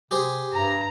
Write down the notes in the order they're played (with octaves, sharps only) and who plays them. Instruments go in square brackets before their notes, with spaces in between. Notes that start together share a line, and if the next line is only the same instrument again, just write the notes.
[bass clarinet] C3 [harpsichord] G4 G#4 C5
[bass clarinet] G2 [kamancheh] A#5